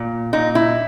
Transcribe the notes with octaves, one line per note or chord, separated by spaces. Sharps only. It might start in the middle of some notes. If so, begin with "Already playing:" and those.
Already playing: A#2
A#2 D#4
E4